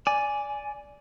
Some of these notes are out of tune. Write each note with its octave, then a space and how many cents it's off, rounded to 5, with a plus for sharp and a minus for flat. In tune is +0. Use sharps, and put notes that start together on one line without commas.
D5 -10 G#5 +0